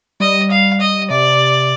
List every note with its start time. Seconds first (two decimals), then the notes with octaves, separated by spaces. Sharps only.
0.20 G3 D#5
0.51 F5
0.81 D#5
1.10 C3 D5